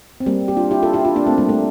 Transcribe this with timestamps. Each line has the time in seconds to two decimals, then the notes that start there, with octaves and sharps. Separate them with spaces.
0.20 C4
0.26 G3 A#3
0.48 G4
0.56 D4 F4
0.71 E4 G4
0.82 F4 A4
0.93 E4 G4
1.05 D4 F4
1.16 A#3 D4
1.26 A3 C4
1.38 G3 A#3
1.49 A3